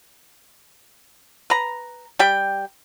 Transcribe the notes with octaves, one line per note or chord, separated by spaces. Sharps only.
B4 A#5
G3 G4 G5